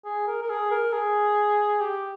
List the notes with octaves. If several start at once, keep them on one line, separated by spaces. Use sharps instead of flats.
G#4
A#4
A#4
G#4
A#4
G#4
G4